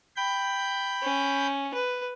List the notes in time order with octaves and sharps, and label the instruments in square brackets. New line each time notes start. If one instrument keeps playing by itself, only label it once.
[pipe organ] G5 B5 G6
[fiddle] C#4
B4